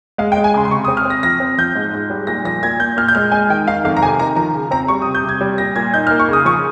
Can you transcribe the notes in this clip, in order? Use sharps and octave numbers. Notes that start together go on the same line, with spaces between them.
G#3 F5
G5
G#3
G#5
C#3 C6
C6
C3 C#6
D#6
C4
F6
C4
A#6
F3 A#6
C4
F3 G6
G#2
G#2
G3
A#2 A#6
F3 A#6
A#2 G#6
A#2 G6
A#2 F6
G6
G#3 F6
G#3 G#5
D#3 G5
D#3 F5
F2 F5
A#5
C3 G#5
D#3 A#5
F3 A#5
C#3
C4 A#5
G3 C#6
D#6
C3
G6
C3
G#6
G3
A#2 A#6
A#2 G#6
D#4 G6
F6
A#3
C#6
C#3 D#6
F3 C#6